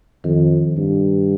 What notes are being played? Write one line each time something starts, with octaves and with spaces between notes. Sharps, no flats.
F2 D#3
G2